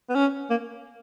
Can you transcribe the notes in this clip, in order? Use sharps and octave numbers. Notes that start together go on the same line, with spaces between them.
B3
C#4
A#3